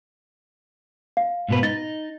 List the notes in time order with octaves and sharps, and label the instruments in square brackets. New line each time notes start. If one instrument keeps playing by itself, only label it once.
[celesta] F5
[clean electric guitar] G#2 B2 B4
[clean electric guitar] D#4 [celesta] A6